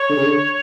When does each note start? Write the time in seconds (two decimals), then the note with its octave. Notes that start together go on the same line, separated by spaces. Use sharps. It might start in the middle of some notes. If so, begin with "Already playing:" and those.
Already playing: C#5
0.10 D3
0.17 C#3
0.25 D3